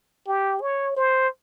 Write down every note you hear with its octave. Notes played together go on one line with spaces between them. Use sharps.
G4
C#5
C5